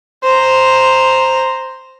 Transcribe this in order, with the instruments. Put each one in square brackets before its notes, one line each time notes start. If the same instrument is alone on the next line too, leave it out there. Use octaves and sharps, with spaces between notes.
[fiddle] C5 A#5